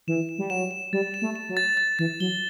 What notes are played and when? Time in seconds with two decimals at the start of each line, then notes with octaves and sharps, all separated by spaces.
0.07 E3 E7
0.29 E7
0.38 G3
0.50 F#3 E7
0.71 E7
0.93 G3 A6
1.14 E7
1.22 A3
1.36 E7
1.49 F#3
1.57 A6
1.77 A6
1.99 E3 A6
2.20 F#3 G7